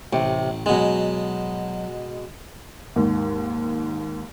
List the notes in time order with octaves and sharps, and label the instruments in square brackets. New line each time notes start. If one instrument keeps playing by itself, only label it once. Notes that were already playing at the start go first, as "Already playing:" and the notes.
[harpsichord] A1 [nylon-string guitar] C3
[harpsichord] B2 G#3 [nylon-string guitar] F#3 G#5
[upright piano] D#2 G#2